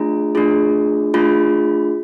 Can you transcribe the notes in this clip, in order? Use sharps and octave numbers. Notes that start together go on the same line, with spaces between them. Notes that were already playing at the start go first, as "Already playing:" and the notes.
Already playing: A3 D4 F4 G#4 A#5
A3 D4 F4 G#4
A3 D4 F4 G#4 B5